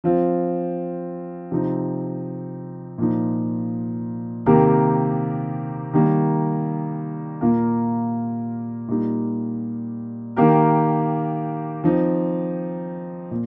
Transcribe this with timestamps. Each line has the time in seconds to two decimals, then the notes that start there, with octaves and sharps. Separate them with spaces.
0.04 F3 C4 F4
1.51 C3 F3 C4 D#4
2.98 A#2 F3 D#4
4.46 C3 D#3 A#3 G4 A#4
5.94 D#3 G3 A#3
7.41 A#2 A#3 F4 A#4
8.88 A#2 G3 D#4
10.36 D#3 A#3 G4 A#4
11.84 F3 C4 D#4
13.31 A#2